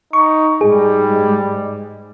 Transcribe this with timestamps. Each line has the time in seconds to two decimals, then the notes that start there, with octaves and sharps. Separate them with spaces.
0.13 D#4 C#6
0.61 G#2 G3 G#3 G#4